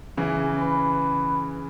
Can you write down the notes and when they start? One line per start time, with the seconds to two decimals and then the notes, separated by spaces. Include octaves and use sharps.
0.17 C#3 E3
0.59 B4